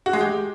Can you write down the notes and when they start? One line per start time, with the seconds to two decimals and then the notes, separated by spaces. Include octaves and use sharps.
0.06 F#4
0.13 G#3
0.21 G4